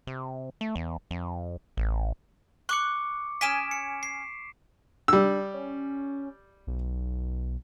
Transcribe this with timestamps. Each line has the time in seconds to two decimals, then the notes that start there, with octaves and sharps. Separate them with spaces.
0.07 C3
0.61 A3
0.76 E2
1.11 F2
1.77 A1
2.69 C#6 D6 F#6 C#7
3.41 C#4 G#5 D#6 B6 D7 E7
3.71 C#7
4.03 C7
5.08 G3 D4 E6
5.54 C#4
6.67 B1